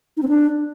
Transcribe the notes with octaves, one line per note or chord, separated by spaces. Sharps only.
D#4
C4
D4